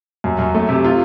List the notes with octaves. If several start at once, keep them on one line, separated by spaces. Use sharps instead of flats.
F#2
F#2
A3
C3
F4